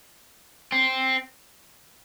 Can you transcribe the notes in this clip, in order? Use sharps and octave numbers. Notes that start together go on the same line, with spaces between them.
C4